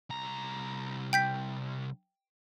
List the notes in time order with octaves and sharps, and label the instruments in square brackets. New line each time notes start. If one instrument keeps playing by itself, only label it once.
[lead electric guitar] C2 A#5
[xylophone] G5 G6 B6